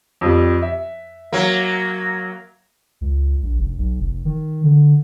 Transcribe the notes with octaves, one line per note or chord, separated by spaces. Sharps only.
F2 F3 G3
E5
F#3 A#3
C#2
A#1
F1
B1
F1
D#3
D3